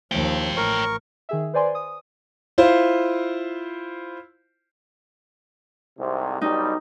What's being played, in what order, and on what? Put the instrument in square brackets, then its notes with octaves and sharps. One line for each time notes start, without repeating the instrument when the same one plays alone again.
[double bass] D#2 F3 [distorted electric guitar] C#5 G5
[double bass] A1 [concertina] A#4 C#6
[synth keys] D#3 G#4 E5
B4 C5 D5 G#5 C6
D#6
[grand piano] E4 F4 C5
[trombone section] C2 G#2 C3
[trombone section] B1 G3 [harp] D#4